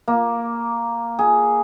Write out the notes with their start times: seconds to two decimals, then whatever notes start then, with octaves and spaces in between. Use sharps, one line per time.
0.08 A#3
1.19 G#4